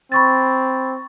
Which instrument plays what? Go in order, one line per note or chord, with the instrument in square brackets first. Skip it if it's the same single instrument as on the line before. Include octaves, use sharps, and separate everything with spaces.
[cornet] C4 [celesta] B5 C#6 A6